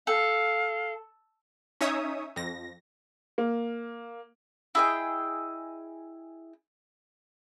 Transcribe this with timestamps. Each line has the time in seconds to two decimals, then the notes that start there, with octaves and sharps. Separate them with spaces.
0.07 A4 F5
1.81 C#4 D#4 C#5 E5 D#6
2.36 F2 A#6
3.38 A#3
4.75 E4 G#4 D#5 G5